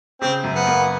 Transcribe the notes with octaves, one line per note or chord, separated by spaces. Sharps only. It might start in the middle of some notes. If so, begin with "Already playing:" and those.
C#3 C4
F#2
B3
A#3